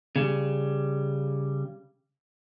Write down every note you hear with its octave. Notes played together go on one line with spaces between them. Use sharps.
C#3 G3